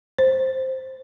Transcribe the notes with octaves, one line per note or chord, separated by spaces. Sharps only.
C5